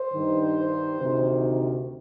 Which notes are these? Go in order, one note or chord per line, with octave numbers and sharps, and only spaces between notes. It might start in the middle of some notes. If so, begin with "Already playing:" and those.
Already playing: C5
G2 D#3
D2 C3 D#3